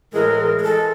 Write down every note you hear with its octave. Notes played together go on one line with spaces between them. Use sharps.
A2 E3 G#3 A#4
G#4
E3 G#3 A4